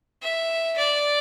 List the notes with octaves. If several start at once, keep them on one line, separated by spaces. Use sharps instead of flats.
E5
D5